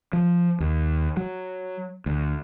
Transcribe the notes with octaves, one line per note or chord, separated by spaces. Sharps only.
F3
D#2
F#3
D2